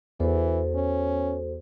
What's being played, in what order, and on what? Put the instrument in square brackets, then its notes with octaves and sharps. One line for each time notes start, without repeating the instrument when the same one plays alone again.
[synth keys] E2 [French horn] E3 [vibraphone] F#4 A4 C5
[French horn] C#4